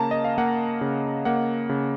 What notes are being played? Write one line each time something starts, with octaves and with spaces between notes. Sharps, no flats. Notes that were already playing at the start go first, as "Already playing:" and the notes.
Already playing: C#3 A#3 A5 A#5
D#5
F5
A#3 F#5
C#3
A#3 F#5
C#3